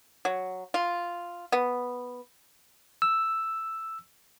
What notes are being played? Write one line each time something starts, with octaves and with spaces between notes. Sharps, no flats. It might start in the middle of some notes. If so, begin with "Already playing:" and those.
F#3
F4
B3
E6